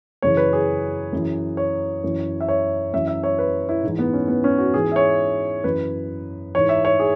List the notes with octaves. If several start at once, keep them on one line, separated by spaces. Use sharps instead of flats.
F#2 C#3 E3 C#5
B4
G#4
F#2 E3
C#5
F#2 E3
E5
C#5
F#2 E3 E5
E5
C#5
B4
E4
G#2 E3
B3
C#4
B3
C#4
F#4
G#2 E3 G#4
E5
C#5
F#2 E3 B4
G#2 E3 C#5
E5
C#5
G#4